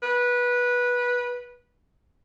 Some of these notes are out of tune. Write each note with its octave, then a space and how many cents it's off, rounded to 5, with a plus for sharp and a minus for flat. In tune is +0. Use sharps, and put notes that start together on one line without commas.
B4 -15